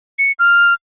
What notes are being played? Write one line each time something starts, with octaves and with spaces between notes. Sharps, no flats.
C#7
F6